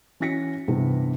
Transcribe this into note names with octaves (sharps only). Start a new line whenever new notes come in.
E3 C#4 F#4 A#6 B6 C#7
G2 C3 E3 B3 C4